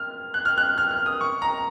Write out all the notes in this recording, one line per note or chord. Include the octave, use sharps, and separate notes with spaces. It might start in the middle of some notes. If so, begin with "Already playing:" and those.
Already playing: F6
F#6
F6
F#6
F6
F6
D#6
C#6
A#5